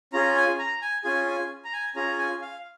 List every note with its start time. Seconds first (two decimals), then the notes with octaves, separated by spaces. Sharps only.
0.13 C#4 F4 G#4 A#5
0.36 G#5
0.59 A#5
0.82 G#5
1.04 C#4 F4 G#4 G#5
1.27 G#5
1.65 A#5
1.73 G#5
1.96 C#4 F4 G#4 A#5
2.19 G#5
2.41 F5